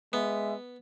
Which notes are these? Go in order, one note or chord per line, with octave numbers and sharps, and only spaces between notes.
G#3 B3 E5